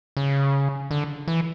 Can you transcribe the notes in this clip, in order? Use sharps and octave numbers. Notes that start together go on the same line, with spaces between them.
C#3
D3
E3